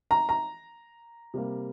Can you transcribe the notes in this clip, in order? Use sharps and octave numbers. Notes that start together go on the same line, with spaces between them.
A#5
A#5
C3 G3 A#3